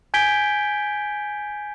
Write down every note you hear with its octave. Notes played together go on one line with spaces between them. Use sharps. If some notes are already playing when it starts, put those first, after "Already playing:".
G#5 G6 G#6 B6 D7 G7